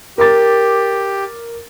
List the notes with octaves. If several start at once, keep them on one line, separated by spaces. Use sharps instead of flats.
G4 A#4 D6 A6